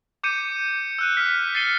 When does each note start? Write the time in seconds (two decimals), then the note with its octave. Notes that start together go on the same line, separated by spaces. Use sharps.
0.23 D6 G6 C#7 D#7
0.99 E6 F#6 D#7
1.17 F6 B6
1.55 A6 C7 C#7 D#7 G7